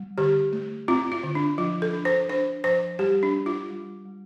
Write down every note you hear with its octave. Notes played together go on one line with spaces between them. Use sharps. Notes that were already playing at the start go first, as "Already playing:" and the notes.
Already playing: G3
D3 G4
A3
C4 F4
F4
D3
D4
F3 F4
A4
D4
C5
D4 C5
F3 C5
G3 G4
D4
D4
F4
G3
G3